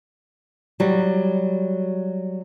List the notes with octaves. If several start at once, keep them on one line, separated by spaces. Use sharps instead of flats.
F#3 G3